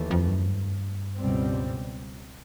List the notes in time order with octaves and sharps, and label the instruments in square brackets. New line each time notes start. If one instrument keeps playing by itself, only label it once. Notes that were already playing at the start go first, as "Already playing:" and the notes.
Already playing: [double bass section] D#2 E3 A3
[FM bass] F2
F#2
G2
[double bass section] C#2 B2 G3 C4